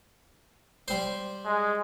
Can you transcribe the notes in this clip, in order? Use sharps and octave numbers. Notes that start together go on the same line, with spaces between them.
G3 C5
G#3